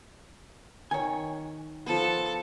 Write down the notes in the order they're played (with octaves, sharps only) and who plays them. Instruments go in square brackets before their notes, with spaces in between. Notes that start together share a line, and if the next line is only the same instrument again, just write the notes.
[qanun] D#3 [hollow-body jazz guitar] C#5 G#5
[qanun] F3 B3 [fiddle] A4